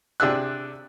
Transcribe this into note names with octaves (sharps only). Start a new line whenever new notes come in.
C3 D4 G#4 E6 F#6